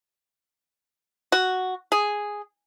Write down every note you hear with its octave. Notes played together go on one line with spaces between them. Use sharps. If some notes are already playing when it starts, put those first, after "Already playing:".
F#4
G#4